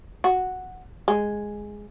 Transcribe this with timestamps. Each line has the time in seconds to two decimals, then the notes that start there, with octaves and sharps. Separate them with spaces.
0.24 F#4
1.08 G#3